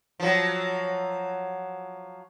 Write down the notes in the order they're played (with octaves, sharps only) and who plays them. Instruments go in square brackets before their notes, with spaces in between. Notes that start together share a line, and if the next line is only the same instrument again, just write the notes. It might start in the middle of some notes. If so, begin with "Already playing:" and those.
[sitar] F3 F#3